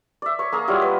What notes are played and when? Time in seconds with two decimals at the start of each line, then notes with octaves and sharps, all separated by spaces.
0.22 D5 E5
0.39 C#5 C#6
0.52 A#3 G#4 A#5
0.68 F#3 G3 E4 F4
0.81 B4 D#5